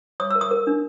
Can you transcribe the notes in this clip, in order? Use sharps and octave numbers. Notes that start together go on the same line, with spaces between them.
C#5 D#6
A#4 E6
D#6
A#4
D4